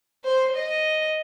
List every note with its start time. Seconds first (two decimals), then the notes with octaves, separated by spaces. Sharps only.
0.24 C5
0.55 D#5